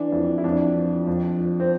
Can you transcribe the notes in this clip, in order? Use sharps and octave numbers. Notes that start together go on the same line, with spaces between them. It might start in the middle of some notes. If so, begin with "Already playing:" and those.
Already playing: E3 D4
F2 E4
E4
F2 D4
F3
F2
F3
C4